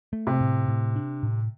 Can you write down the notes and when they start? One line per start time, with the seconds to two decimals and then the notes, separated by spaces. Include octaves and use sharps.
0.13 A3
0.27 C3
0.41 A2
0.68 A2
0.96 D4
1.23 A2